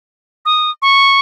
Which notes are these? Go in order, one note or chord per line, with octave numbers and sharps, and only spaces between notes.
D#6
C#6